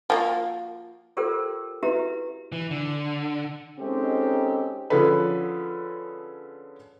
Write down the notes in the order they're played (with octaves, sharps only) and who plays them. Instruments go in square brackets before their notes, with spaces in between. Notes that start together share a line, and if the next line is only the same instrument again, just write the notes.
[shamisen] F3 A#3 F#4
[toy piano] F4 G4 A4 A#4 C5 G5
E4 F#4 G4 B4 E5 A#5
[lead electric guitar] E3
D3
[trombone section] G#3 C4 C#4 D#4 G4 A4
[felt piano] D3 F3 C#4 G#4 A4 B4